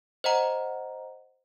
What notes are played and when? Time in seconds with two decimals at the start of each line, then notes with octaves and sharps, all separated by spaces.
0.24 C5 D#5 F#5 A#5